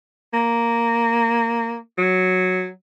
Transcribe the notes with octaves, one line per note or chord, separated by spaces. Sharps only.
A#3
F#3